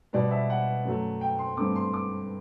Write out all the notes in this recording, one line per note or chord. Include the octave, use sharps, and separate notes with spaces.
B2 G3 B3 D5
E5
F#5
F#2 F#3 A3
G5
C6
G2 D3 A3 C4 D6
C6
D6